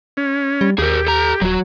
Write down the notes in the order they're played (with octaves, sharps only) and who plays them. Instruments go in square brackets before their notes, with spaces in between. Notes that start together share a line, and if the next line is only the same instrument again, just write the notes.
[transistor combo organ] C#4
[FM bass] G3
[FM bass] D#2 [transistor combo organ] G4 [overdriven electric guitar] G#4 A#4
[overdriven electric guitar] A4 A#5
[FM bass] D#1 [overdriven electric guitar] F#3 F#4